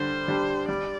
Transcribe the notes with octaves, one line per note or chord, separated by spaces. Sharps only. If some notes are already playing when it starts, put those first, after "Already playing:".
Already playing: D3 G3 D4 C5
G3 D4 G4
G3 D5